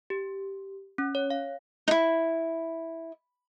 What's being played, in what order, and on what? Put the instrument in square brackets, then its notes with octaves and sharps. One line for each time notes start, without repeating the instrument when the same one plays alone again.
[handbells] G4
C#4
C#5
F5
[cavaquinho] D#4 E4